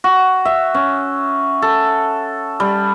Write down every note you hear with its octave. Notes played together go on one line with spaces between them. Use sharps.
F#4
E5
C#4
A4
G3